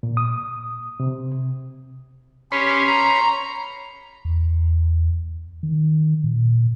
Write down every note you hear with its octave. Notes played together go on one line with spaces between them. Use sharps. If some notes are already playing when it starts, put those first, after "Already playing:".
A#2
D#6
C3
C#4 G4 C#5 B5 C6
A#5
E2
D#3
A#2